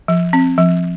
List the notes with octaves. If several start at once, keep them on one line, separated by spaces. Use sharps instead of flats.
F3
C4
F3